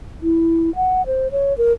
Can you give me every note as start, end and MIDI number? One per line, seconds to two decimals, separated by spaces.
0.22 0.74 64
0.76 1.05 78
1.06 1.31 72
1.32 1.56 73
1.58 1.73 70